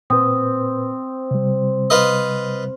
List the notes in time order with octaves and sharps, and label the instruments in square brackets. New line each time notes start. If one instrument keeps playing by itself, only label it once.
[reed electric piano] A#2 B4 [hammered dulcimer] C4 [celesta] D#6
[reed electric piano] C3 G3
[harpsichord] F4 B4 D#5